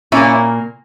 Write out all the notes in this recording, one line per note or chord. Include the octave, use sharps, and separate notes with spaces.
A#2 A#3 C#4 E4